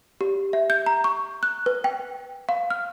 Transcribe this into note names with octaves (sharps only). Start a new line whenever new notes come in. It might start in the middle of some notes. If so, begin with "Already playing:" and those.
G4
E5
G6
A#5
C#6
F#6
B4
G5
F5
F6